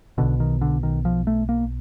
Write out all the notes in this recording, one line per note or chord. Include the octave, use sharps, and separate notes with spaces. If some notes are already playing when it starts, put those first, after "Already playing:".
B1 B2 D3
D#3
D3
D#3
F3
A3
A#3